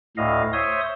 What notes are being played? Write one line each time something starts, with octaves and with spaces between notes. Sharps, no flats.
D2 A2 D#5 F5
C5 C#5 E5 C6 D#6